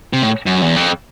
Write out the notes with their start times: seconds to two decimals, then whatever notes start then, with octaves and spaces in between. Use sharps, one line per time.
0.13 C3
0.22 A2
0.46 F#2
0.62 E2
0.76 F2